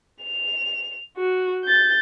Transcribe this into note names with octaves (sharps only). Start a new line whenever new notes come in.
F7
F#4
G6 A6